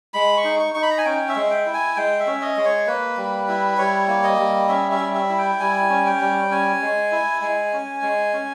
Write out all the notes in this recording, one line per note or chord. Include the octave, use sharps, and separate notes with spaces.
G#3 B5
C#6
D#4
C#6
D#4 C#6
B5
A#5
G#5
C#4 G5
E5
G#3
G5
E4
G#5
G#3 G5
E5
C#4
D#5
G#3
C#5
A#3 B4
G3
E4
G3 C#5
A#3
D#5
G3
C#4 E5
E5
G3
E5
E4
G5
G3 G#5
C#4
G5
G3
C#4 G#5
G#3
E4
G#3 G#5
C#4
G#3
C#4